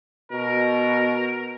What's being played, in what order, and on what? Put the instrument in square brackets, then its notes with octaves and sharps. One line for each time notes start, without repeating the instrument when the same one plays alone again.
[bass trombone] B2 [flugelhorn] A#4